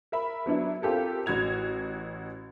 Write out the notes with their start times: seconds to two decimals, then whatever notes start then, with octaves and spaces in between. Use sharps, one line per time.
0.12 A#4 E5 B5
0.46 F#3 B3 D4 E4
0.82 C4 F4 G4 A4 A#4
1.26 A1 F#4 G#6 F7